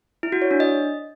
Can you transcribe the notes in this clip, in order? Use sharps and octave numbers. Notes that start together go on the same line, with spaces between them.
E4
F#4
C#5
D4
D#5